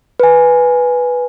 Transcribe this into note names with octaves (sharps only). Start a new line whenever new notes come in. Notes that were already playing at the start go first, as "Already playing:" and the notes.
B4 G#5